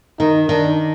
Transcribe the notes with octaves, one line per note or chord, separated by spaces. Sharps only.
D#3 D#4
D#3 D4